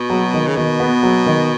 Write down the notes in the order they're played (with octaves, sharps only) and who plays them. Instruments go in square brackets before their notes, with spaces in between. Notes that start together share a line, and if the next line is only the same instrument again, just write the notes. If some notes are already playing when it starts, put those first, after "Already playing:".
Already playing: [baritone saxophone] B2
[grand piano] F#3
D#3
[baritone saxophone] C#3
[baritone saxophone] B2 [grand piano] D#3
[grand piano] B3
F#3
D#3